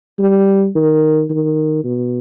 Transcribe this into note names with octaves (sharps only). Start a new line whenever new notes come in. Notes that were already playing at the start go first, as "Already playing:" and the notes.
G3
D#3
D#3
B2